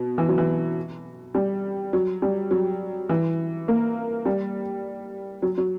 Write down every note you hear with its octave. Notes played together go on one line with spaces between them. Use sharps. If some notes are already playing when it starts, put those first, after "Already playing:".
Already playing: B2
E3
F#3
E3
G3
F#3
G3
F#3
E3
A#3
G3
F#3
F#3